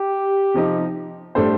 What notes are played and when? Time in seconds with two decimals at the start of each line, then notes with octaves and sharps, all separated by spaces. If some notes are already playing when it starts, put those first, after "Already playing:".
Already playing: G4
0.54 C3 F3 C4 D#4
1.35 A2 G3 D4 A4 C5